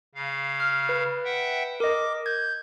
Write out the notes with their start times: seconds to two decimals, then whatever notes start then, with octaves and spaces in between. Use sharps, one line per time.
0.15 C#3 F5
0.60 F6
0.89 B4
1.25 E5 F#5 G5
1.80 A#4 D#5 D6
2.26 G6 G#6